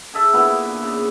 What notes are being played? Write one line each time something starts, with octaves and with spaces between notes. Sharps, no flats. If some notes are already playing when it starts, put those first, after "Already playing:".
G#4 A4 E5 A5
A#2 D3 B3 E4
C#3